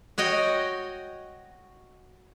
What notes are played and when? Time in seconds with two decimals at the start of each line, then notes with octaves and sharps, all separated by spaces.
0.18 F#4 C#5 D#5 G5